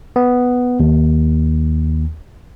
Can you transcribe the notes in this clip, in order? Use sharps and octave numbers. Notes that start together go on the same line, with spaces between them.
B3
D#2